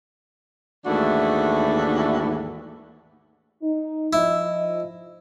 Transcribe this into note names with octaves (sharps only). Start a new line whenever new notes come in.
D#2 G#2 E3 A3 D4 F#4
D#4
F3 E4 D#5